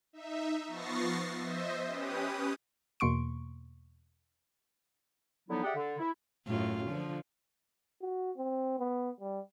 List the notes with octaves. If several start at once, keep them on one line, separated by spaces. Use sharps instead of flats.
D#4 E5
F3 B3 C#6 A6 A#6 C7
C5 D#5 E5
C#4 G4 B4 D#6
E2 B2 A#3 C6 C#6 D7
D3 F3 F#3 B3 D#4 E4
G4 G#4 D5 E5 F#5 G5
D3
E4
F#2 A2 F4
D3 F3
F#4
C4
B3
G3